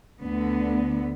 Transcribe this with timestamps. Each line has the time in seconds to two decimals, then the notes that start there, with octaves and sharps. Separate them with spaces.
0.22 D2 D3 B3